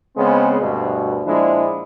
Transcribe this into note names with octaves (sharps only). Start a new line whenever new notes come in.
C#3 G#3 B3 C4
D2 G2 B2
A#2 F3 G#3 D4 E4